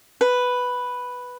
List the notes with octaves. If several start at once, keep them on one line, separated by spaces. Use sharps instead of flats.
B4